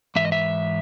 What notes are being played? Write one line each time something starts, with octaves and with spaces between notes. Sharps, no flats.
G#2 E3 E5
D#5
E5